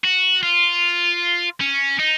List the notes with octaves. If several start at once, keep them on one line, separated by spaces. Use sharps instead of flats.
F#4
F4
C#4
D#4